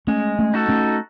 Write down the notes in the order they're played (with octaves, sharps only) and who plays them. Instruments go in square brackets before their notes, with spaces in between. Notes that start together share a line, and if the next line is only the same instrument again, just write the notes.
[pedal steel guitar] G#3 [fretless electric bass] A3 C#4
[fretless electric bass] A3 C#4
[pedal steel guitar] D#4 F#4 A4
[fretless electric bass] A3 C#4